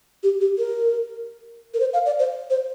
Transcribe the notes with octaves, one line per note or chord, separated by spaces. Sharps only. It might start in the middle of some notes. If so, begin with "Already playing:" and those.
G4
G4
A#4
A#4
C5
F5
D5
C5
C5